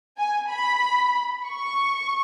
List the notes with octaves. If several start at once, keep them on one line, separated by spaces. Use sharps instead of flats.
G#5
B5
C#6